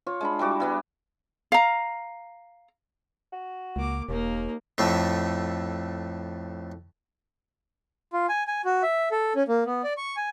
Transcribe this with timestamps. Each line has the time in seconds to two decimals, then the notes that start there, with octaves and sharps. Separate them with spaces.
0.07 F4 C#5
0.21 G#3 D4 B5
0.39 G3 E4 F#4 D5
0.60 G3 B3 E4
1.52 F5 A#5
3.32 F#4
3.76 C#2 A#3 D6
4.09 E1 D#2 A#3 D#4
4.78 F2 A2 A3
8.13 F4
8.29 G#5
8.47 G#5
8.65 F#4
8.83 E5
9.12 A4
9.36 C#4
9.48 A#3
9.66 B3
9.84 D5
9.97 C#6
10.17 G#5